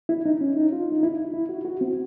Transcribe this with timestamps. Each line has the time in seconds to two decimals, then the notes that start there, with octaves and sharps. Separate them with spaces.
0.09 E4
0.26 D#4
0.41 C#4
0.57 D#4
0.72 F4
0.92 D#4
1.03 E4
1.34 E4
1.49 F#4
1.65 F#4
1.81 C4